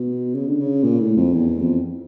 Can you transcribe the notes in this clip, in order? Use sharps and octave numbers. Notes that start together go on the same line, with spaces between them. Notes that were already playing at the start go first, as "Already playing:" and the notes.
Already playing: B2
C#3
D3
C#3
A#2
A2
F2
E2
F2